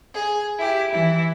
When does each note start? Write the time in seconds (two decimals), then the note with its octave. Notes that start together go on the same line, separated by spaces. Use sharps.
0.14 G#4
0.58 E4 G4
0.90 E3 E4